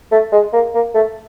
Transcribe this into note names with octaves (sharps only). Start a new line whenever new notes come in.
A3
G#3
A#3
A#3
A3